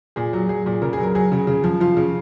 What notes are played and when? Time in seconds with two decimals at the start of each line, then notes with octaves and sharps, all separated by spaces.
0.16 A#2 G#4
0.33 F#3
0.49 F#3 G#4
0.66 A#2
0.82 C#3 A#4
0.93 G#4
0.98 F#3
1.03 A#4
1.15 F#3 G#4
1.32 C#3
1.47 C#3
1.64 F3
1.80 F3 F4
1.97 C#3